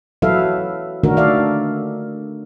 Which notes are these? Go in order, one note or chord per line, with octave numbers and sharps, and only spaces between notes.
F#3 E4 A4 B4 E5 F5
D3 D#3 A3 D4 F#4 A#4
D#3 A4 D5 E5 F5